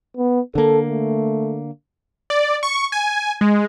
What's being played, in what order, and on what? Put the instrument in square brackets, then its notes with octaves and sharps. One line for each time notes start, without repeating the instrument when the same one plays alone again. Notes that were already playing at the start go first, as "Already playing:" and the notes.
[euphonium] B3
[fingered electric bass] D3 A#3 [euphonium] A4
[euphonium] A3
[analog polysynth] D5
C#6
G#5
G#3